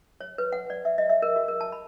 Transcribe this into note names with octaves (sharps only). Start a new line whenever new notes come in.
C#5
B4
F#5
D5
E5
D#5
E5
A#4
F#4
A#4
A5
B5